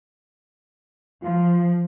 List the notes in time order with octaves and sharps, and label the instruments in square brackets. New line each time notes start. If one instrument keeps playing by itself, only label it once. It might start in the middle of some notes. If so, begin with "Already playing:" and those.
[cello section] F3 [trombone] F4